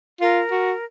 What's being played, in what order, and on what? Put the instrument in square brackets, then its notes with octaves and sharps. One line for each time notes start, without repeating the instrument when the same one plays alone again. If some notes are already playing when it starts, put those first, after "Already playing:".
[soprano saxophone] F4 [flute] A#4
[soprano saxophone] F#4